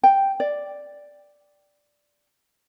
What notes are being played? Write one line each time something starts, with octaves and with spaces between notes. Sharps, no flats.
G5
D5